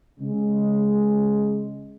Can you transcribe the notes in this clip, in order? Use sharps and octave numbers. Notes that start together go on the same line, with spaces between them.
C#3 G#3